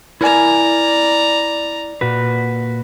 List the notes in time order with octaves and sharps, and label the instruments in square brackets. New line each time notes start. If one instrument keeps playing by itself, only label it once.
[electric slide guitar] E4 A#4 G#5 [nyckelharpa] D5 A#5
[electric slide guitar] A#2 F#4 B4